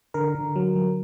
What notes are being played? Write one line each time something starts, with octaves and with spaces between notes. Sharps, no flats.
D3 A#4
D3
F#3
F#3